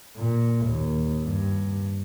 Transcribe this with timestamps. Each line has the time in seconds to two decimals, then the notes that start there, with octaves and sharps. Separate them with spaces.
0.17 A#2
0.67 D#2
1.23 G2